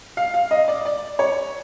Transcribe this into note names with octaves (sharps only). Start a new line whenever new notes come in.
F5
F5
D#5
D5
D5
C#5